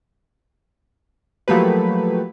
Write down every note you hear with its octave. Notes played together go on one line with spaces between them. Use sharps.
F3 F#3 A3 A#3 G4 B4